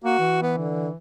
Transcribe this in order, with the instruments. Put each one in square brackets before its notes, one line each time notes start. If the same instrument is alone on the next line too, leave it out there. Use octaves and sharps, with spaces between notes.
[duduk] A#3 [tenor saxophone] F#4
[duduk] E3
[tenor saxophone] B3
D3